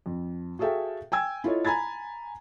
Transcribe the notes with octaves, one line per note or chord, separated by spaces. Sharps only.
F2
F#4 G#4 A4 E5 F5 G5
G5 G#5 E6 G#6
E4 F4 A4 C#5 D#5
G#5 A#5 B5 G#6 A6